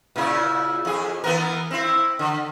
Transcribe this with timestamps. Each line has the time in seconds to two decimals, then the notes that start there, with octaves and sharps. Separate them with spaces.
0.16 A#2 C#3 E4
0.85 F2 G#4
1.24 E3 B3 A#4
1.71 C4 E4
2.19 D3